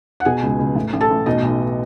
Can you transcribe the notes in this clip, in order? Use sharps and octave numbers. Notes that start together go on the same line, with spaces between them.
F#5
B2 G#4 G#5
C#2
C#2
A2
A1
A4 A5
A1
B2 D#4 D#5
B1